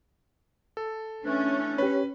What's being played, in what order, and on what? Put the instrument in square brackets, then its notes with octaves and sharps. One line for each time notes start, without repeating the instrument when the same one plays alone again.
[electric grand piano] A4
[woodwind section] E3 A3 D4 [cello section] C#4
[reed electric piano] G4 C#5 [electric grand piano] B4